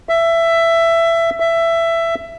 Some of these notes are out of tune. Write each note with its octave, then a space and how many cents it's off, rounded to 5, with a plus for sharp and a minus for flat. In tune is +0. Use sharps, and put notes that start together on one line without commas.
E5 +15
E5 +15